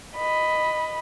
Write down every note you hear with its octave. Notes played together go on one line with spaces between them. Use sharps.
D#5 B5